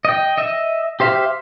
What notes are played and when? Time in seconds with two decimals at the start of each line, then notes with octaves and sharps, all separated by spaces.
0.05 D#5 G5
0.38 D#5 E5
1.00 G4 C5 E5 F5